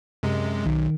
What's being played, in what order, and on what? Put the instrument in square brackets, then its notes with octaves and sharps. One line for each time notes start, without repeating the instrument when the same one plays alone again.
[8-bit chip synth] F#2 C3 G#3
[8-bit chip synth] B1 [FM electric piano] D#3